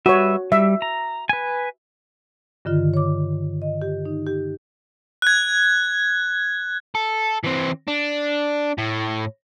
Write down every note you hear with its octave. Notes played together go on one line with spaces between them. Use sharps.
G3 F#4 B4 C#5 E5
G3 E5
A#5
B4 G#5
G2 D3 D#3 F4
C#5 D6
D#5
G4
D#4
G4
F#6 G#6
A4
E3 C4
D4
A2